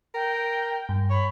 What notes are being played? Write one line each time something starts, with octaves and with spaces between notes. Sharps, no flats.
A#4 G5
G2
C#5 B5